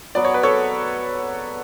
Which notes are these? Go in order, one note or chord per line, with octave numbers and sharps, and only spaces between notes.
F#3 B3 F#4 D5
C#5
B4
A4 C#5